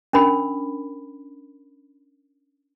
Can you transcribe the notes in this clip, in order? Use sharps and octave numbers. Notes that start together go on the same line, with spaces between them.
C#4 D4 A#4 B5